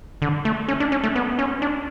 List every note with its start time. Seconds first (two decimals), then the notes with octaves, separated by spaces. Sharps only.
0.22 D3
0.45 A3
0.68 C#4
0.80 D4
0.92 C#4
1.04 A3
1.15 B3
1.39 C#4
1.62 D4